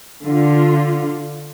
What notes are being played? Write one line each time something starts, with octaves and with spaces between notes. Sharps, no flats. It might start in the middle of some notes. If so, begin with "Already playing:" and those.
D3 F4